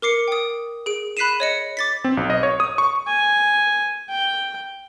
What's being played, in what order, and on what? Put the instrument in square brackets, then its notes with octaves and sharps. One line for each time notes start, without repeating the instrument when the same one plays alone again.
[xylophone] A#4 D6 C7 C#7
G5 D#6
G#4 D7
B5 F#6 B6 C7 D#7 E7
C#5 D#5 C#7
D6 A6 B6
[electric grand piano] C4
B1
D#5
C#5
D#6
C#6
[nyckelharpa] G#5
G5